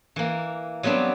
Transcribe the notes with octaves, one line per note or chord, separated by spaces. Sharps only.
E3 A#3
F#3 G3 B3 C4 D4